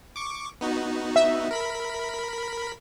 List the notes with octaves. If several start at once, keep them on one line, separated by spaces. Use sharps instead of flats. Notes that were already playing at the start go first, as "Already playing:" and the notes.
C#6 D6
B3 D#4 F#4
E5
A#4 B5 B6